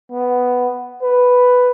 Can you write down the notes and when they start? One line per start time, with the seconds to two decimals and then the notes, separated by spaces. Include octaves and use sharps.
0.12 B3
1.02 B4